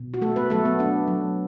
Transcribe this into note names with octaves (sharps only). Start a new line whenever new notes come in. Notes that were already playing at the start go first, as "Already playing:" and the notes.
Already playing: B2
F#4
A3 A4
B3 B4
F#3 A3 A4
B3
A3 D4
F#3